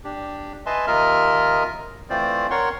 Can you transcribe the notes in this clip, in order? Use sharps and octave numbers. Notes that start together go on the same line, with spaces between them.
D4 G4
B4 D#5 E5 G#5 A5 C6
D#2 F4 A#4 D#5 E5 F6
E3 A3 C4 F4 C5 D5
A#4 C#5 F#5 C6 C#6